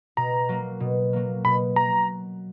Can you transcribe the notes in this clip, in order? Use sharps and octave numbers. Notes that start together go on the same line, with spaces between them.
B2 A#5
F#3 A#3
B2
F#3 A#3
B2 B5
F#3 A#5